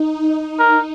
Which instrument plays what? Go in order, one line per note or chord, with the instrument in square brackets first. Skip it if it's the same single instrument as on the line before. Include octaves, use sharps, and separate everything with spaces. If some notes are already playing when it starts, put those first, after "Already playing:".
Already playing: [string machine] D#4
[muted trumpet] A#4